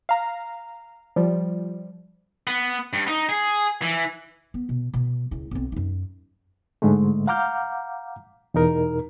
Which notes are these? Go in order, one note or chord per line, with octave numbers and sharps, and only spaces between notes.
F5 A#5
F3 G3
B3
G2
D#4
G#4
E3
B3
B2
B2
C#2 E4
B1 C4
F#2 D#4
G#2 D3 G#3 A3
F5 F#5 A#5 D6 F6 G6
E2 B2 D#4 A#4